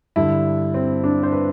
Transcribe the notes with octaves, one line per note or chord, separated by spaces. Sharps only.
G2 D3 E4
C4
D4
C5
B4